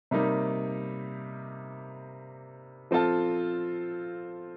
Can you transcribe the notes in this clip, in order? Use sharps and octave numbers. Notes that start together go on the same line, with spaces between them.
C3 G3 A#3 D#4
F3 C4 F4 A4